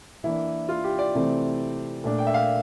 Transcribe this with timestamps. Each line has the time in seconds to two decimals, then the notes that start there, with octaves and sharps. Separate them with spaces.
0.24 E3 A#3 D4 E4
0.69 F4
0.84 G4
0.99 D5
1.14 C3 E3 A3 C4
2.04 A#2 A3 D4
2.19 G5
2.27 E5
2.34 F5